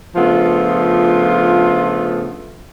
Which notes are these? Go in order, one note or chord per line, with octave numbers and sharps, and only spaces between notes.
C#3 F3 A3 B3 D4 F4